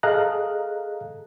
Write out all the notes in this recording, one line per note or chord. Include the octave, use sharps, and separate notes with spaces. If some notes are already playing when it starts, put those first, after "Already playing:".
G#4 A4 D#5 F5 A#5 F#6